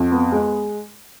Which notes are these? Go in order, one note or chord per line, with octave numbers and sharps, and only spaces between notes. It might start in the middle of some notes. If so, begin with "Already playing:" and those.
Already playing: F2
B3
G#3